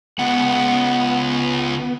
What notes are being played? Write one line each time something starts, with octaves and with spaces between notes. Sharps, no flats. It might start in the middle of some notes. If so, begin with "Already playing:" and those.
C#2 B3 F#5